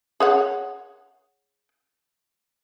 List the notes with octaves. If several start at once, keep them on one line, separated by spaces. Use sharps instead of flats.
G#4 C#5 F#5